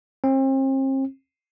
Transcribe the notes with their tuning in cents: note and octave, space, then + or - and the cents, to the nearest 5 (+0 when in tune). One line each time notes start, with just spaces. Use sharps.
C4 +40